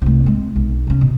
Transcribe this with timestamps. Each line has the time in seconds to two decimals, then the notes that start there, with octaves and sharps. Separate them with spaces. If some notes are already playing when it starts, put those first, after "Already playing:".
0.02 C2 A3
0.26 G#3 C4
0.56 B1
0.87 C3 C#4
1.01 B2